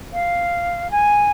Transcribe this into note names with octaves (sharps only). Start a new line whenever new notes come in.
F5
G#5